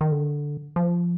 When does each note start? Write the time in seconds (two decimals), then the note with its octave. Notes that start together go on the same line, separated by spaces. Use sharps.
0.01 D#3
0.12 D3
0.76 F3